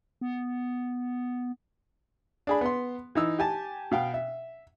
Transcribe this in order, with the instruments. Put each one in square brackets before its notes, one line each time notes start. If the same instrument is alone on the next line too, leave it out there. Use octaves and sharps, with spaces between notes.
[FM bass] B3
[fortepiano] D4 G#4 B5
B3 C6
E3 D#4 E6
G4 G#5 A5
B2 F5 G5
E5